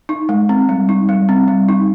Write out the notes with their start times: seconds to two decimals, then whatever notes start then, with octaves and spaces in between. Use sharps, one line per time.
0.09 D#4
0.29 G#3
0.49 C4
0.69 G3
0.89 D#4
1.09 G3
1.29 C4
1.48 G3
1.68 D#4